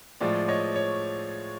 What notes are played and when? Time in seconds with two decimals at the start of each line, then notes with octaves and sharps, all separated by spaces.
0.21 A2 F3 G#3 D5
0.48 C#5 D#5
0.76 C#5